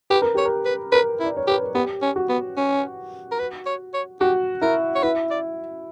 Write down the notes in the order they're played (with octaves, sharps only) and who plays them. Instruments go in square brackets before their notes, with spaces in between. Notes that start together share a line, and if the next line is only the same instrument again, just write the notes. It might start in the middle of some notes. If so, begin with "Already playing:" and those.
[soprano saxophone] G4 [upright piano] B4
[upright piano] A#4
[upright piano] G4 [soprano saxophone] C#5
[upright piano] A#4
[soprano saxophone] B4
[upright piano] A#4 [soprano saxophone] B4
[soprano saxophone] E4
[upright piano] D5
C#5
[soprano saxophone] G4 [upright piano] B4
[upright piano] A#4
[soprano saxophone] B3 [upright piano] G4
[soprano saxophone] C#4
[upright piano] F#4
[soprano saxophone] B3
C#4
A#4
B4
C#5
C#5
[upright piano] F#4 [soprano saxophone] G4
[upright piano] E4 [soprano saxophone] A#4
[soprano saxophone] C#5
[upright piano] E4 [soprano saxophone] B4
[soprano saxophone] D5